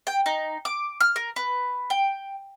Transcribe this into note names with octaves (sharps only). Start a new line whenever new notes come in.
G5
D#4
D6
F6
A#4
B4
G5